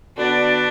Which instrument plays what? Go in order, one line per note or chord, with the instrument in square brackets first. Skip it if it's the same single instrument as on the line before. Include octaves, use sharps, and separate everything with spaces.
[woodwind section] D3 B3 F#4 B4 D5 [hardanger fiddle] D4